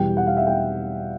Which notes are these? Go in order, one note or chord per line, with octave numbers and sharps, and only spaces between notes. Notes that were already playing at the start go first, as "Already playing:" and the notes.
Already playing: E2 B2 G3 G5
F#5
F5
E5
G5